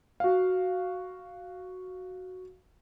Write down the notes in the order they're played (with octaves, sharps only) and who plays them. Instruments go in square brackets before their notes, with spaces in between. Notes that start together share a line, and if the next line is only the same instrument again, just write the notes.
[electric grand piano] F#4 F5